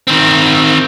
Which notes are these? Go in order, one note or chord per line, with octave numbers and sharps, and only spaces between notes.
D#3 C4